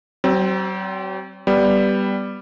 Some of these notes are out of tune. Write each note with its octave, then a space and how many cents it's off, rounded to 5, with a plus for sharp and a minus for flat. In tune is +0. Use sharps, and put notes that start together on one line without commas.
F#3 +45 C4 +0
G3 +0 B3 +0